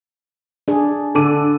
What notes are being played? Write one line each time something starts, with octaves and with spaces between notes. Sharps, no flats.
D4 G#4
D3 A4 D6 D#7